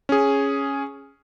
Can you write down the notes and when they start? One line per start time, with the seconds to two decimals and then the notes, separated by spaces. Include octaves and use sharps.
0.09 C#4 G#4